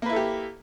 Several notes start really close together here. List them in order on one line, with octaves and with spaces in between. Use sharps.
A#3 B4 E4 A4 G4